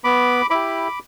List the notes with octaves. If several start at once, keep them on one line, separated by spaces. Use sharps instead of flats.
B3 B5 D6
E4 G4 B5 D6